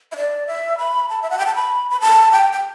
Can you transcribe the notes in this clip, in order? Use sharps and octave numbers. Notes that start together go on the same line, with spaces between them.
E5
D5
E5
B5
A5
E5
F#5
G5
A5
B5
B5
A5
G5
G5